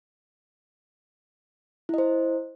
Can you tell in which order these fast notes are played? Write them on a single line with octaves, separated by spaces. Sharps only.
E4 D#5 C5